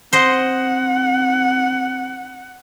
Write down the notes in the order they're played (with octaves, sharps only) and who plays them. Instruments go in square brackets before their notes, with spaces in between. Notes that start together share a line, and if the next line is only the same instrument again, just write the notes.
[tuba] C4 [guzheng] C5 D#5 [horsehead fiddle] F#5